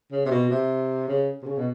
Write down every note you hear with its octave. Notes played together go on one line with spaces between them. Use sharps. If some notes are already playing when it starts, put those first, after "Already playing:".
C#3
C3
B2
C3
C#3
C3
C#3
B2